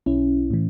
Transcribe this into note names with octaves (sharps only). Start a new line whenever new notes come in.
B1 C#4 E4
A2 E3